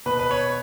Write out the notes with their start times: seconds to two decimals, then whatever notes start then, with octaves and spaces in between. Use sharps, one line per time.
0.06 B2 B4
0.19 B4
0.31 C#5